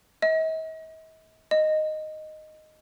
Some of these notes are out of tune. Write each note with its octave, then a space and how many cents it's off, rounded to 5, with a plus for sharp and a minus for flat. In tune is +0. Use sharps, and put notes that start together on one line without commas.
D#5 +45
D#5 -5